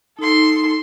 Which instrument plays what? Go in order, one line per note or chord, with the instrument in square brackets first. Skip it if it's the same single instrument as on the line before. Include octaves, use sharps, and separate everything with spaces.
[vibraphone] D#4 [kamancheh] A4 C6